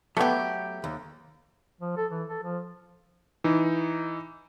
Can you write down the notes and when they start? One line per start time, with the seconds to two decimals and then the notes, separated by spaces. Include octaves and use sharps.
0.17 F#3 A3 B3 G4
0.84 D#2
1.81 F3
1.97 A4
2.11 E3
2.29 A4
2.43 F3
3.44 E3 D#4